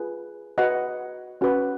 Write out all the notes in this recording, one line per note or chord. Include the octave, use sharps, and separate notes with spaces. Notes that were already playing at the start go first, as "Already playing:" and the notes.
Already playing: F4 G#4 B4
F#4 B4 D#5 F#5
C#4 F#4 B4